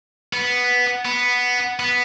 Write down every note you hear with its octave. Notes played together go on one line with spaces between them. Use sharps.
B3
B3
B3